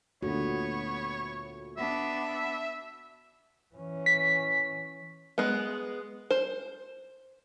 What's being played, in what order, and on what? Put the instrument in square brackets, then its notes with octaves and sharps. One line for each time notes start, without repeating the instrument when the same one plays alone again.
[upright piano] D2 A#2 D3 [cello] B3 [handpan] F#4 [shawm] C#5
[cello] B3 D4 [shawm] E5
[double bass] E3 C#4
[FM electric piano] B6
[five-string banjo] G#3 B3
C5